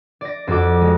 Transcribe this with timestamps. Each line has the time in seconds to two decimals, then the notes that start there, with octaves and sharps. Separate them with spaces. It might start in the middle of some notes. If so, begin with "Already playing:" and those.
0.21 D5 A#6
0.47 F2 F#4 A4 D6
0.81 G#3